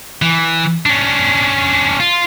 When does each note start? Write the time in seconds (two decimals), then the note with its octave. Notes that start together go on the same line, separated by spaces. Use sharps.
0.22 E3
0.86 C#4 D4
2.00 F4